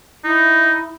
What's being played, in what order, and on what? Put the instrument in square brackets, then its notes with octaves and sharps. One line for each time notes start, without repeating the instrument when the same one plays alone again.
[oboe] D#4 [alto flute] E4